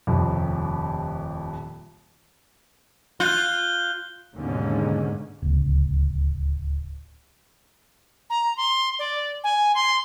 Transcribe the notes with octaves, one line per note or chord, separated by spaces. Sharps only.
D#1 C2 F2
F4 F#6 G6 G7
D#2 G#2 B2 D3 G#3 C#4
D1 C#2
A#5
C6
D5
G#5
C6